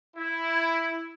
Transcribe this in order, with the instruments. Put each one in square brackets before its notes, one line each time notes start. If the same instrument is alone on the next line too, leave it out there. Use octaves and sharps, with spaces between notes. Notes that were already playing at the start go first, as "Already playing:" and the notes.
[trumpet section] E4